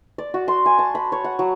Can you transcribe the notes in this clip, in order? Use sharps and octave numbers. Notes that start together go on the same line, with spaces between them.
D5
F#4
C6
G#5
A5
B5
C#5
F#5
F#3